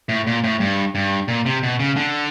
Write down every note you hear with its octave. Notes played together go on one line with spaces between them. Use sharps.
A2
A#2
A2
G2
G2
A#2
C3
B2
C#3
D3